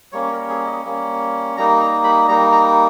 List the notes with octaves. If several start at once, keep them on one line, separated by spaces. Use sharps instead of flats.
G3 A#3 C#4 C#5
A#4
G#4
D#5
G3 A#3 C#4
G3 A#3 D#4 A#5
A#5
B5
G3 A#3 D#4 A#5
A#5